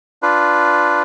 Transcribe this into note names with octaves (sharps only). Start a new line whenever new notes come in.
D4 F4 B4